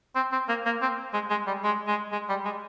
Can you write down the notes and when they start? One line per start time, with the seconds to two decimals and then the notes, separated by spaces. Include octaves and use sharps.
0.15 C4
0.32 C4
0.48 A#3
0.65 A#3
0.82 C4
1.14 G#3
1.30 G#3
1.47 G3
1.64 G#3
1.87 G#3
2.12 G#3
2.29 G3
2.45 G#3